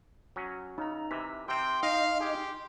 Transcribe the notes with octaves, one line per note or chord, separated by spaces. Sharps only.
F#3 C#4
C#3 D#4 A#5
C3 E3 B6
C3 C4 G5 C6
D#4 D#5 F5
G4 G#4